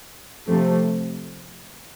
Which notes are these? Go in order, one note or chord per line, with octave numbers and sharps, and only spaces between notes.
C3 F3 A3